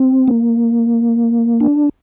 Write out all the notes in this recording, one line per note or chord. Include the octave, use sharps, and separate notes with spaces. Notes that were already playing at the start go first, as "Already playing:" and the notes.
Already playing: C4
A#3
D4